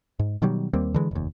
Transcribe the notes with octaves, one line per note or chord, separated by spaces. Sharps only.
G#2
B2 D#3 F#3 G3
D#2 G3 A#3 C4
D3 E3 G#3
F1 D#2